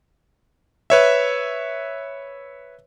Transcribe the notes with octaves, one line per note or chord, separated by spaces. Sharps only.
B4 C#5 E5